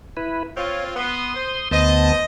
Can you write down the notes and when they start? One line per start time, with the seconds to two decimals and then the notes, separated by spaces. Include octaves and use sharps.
0.17 E4 B4
0.57 C4 F4 C#5
0.96 B3 C6 D#6
1.35 C5
1.71 D2 B3 C5 D#5 A5